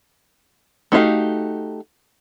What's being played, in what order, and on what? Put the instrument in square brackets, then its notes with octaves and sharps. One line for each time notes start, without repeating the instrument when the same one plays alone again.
[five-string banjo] A3 D#4 F#4 G4 F5